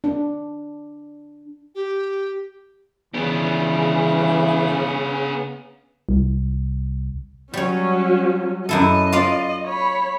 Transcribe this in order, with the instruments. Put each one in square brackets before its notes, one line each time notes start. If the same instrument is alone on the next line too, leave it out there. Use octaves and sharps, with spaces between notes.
[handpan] D4
[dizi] G4
[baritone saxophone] C#3 [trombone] E3 [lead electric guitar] B3 D4
[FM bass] C2
[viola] F#3 C#4 [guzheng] G3 C#5
[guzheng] F#2 E4 A4 [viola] D#5
[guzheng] F4 D5 F5
[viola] C#5 B5